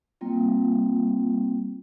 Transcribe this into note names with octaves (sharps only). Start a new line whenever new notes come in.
G3 A#3 C4 F4